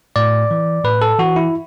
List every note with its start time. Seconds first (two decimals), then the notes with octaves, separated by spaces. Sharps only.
0.16 A2 D5
0.51 E3
0.84 A2 B4
1.02 A4
1.19 E3 F#4
1.36 E4